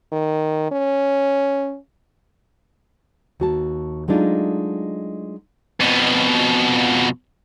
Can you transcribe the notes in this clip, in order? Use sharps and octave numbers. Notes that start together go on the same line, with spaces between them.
D#3
C#4
D#2 F#4 A5
F#3 G#3 A3 D4 D#4 F4
F2 B2